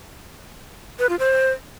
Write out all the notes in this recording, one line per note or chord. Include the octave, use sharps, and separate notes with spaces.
B4
F4
C5